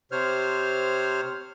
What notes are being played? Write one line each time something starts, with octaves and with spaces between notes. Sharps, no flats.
C3 C5 C#5 F6